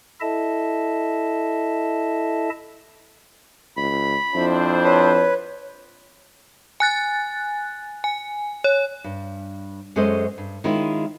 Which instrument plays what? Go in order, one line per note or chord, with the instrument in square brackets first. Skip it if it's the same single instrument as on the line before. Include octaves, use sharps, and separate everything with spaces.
[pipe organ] E4 A4 D#5 E5 A5
[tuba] C#2 [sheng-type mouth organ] B5
[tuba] F2 [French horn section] D4 E4 C5
[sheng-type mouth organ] B4 [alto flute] C#5
[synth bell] G#5 F#6 A6
G#5
C#5
[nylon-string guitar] G2
F#2 G#3 C#4 A4 C5 D#5
G2
D#3 G#3 C#4 E4 F4